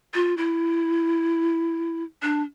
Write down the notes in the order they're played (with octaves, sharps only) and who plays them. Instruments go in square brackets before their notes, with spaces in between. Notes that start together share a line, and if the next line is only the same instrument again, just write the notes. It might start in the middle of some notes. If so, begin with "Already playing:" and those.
[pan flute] F4
E4
D4